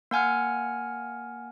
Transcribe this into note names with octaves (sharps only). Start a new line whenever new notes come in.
A#3 F#5 G#5 F6